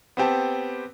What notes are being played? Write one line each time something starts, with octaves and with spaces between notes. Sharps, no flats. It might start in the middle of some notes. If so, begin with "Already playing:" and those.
B3 C4 G4 A5